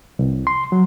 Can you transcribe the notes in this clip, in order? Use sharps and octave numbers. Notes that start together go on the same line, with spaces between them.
C2
C6
F#3